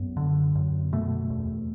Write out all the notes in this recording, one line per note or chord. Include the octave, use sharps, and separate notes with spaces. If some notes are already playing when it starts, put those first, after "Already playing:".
Already playing: F#2 B3
D3
F#2
B2 A3
E2